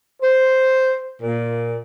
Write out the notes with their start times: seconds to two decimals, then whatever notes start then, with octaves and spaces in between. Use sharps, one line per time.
0.21 C5
1.22 A#2